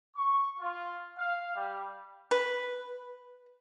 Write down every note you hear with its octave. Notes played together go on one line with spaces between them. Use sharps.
C#6
F4
F5
G3
B4